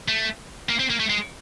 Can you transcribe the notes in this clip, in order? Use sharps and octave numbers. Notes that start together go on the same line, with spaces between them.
A3
A#3
C4
A#3
A3
G#3